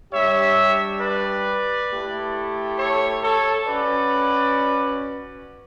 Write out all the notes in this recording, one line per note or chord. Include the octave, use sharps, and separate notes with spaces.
G3 D4 G4 C#5 E5
B4 D5
A3 E4 G4
A4 C#5
A4 C#5
C#4 F#4 B4 D5